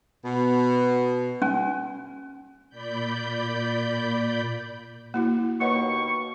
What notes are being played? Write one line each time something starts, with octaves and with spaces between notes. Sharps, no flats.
B2
C#4 G#5
A#2 D5 B5 G6
A#3 E4 F#4
D#2 B2 A#3 C#5 F#5 C#6